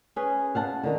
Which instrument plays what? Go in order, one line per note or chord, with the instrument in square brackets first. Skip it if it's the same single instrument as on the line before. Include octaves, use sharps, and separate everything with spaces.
[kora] C#4 G#4 B4
[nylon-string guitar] F5 F#5 A5
D3 D#3